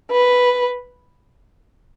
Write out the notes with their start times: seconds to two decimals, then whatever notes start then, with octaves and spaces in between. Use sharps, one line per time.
0.11 B4